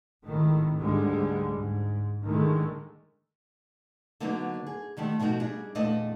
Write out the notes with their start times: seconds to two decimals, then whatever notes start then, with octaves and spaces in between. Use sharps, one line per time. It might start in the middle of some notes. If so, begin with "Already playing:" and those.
0.24 G#1 A2 D#3 A3
0.78 D2 G#2 D3 G3 G#3
1.52 G#2
2.24 A2 D3 D#3 G#3 A3
4.20 D3 F#3 A#3 B3 D4 D#4
4.67 G#4
4.97 D2 D#3 G3 A3
5.20 B2 F3 A3 D#4 F#4
5.40 G3 D4 G#4
5.75 E2 A#2 A3 D4 D#5